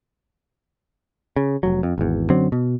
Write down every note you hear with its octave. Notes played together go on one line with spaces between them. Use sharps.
C#3
F1 F#3
F2
G#1 E2
F#2 D3 F#3 C4
B2